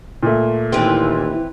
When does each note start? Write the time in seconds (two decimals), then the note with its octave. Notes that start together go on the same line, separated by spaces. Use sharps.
0.23 A#2 A3
0.72 D#2 E3 C4